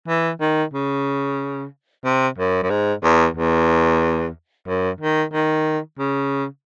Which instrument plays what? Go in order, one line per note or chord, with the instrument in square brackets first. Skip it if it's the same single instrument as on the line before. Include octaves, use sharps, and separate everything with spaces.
[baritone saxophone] E3
D#3
C#3
C3
F#2
F#2
G#2
E2
E2
F#2
D#3
D#3
C#3